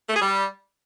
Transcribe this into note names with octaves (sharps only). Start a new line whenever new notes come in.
A3
G#4
G3